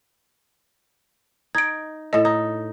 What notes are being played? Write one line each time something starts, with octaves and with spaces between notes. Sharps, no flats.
D#4 G#6 D7
A2 A4 D#5
D#4